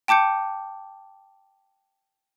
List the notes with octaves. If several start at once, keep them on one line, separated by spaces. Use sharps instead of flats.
G5 A5 D6 G6 C#7